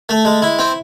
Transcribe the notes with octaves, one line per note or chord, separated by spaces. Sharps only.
A3
G#3
E4
C4